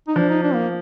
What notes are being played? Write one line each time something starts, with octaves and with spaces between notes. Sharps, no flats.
D#4
F3 D4
D#4
D4
A#3